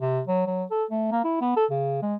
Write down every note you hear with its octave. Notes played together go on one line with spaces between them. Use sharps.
C3
F#3
F#3
A4
A3
A#3
E4
B3
A4
C#3
G#3